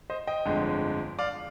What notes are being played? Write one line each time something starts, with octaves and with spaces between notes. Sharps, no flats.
C5 D#5
D#5 G5
G1 F2 D3 G#3
D5 F5